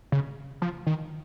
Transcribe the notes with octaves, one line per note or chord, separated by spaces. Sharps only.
C#3
F3
D#3